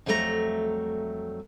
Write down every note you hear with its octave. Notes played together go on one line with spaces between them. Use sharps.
F2 F#3 G3 A3 A4 A#5